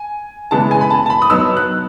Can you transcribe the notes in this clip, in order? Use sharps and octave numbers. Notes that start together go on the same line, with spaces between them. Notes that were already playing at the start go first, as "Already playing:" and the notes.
Already playing: G#5
C#3 E3 G#3 B3 A5
G#5
B5
A5
A5
B5
D#6
F#3 B3 D#4 E6
F#6